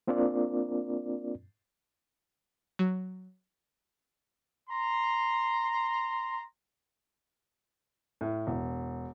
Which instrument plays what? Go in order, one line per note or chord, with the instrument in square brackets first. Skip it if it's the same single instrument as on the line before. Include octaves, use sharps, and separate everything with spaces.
[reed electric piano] A#3 C4 D4 F4 A#4 D5
[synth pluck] F#3
[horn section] A#5 C6
[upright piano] A2
E1